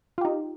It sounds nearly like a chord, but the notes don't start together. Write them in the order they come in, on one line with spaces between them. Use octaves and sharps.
F4 G4 D#4